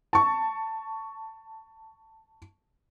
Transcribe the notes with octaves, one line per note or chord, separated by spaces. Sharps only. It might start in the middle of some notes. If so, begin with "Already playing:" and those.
A5 C#6